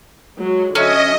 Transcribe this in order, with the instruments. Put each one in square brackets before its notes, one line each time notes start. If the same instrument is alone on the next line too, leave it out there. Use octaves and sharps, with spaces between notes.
[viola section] F#3 G#3
[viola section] D3 F#3 E5 [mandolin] C#4 [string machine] D#5